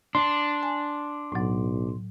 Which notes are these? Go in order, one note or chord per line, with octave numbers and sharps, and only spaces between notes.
D4 C6
G#5
B1 A2 F#3